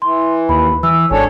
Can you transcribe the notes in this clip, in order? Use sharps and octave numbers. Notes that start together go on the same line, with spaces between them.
E3 C6
D#2 B5
E3 E6
G#1 D4 A4 C#5 G#5